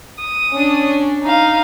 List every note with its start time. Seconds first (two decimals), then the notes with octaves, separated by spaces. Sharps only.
0.20 D#6
0.51 C#4 D4
1.23 D#4 F5